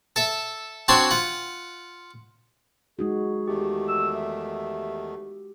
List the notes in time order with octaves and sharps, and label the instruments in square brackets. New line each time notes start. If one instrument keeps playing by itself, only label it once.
[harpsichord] A4 E5
C4 D4 F#4 C#5 A5 C6
F4 F#5
[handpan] G#3 D#4 F#4 [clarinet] G#4
[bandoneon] E2 D#3 A3 [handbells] G4
[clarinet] E6
E5